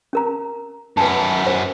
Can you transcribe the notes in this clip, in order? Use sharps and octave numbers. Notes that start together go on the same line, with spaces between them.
C#4 A#4 A#5
F#2 B3 B4 G#5 A5
C5